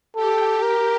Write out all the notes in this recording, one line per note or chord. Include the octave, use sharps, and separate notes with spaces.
G4 A4
A#4